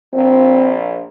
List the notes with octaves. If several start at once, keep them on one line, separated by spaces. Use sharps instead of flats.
A#1 C4